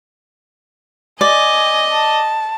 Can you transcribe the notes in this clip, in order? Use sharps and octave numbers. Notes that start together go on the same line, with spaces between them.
D5 D#5 G#5
A5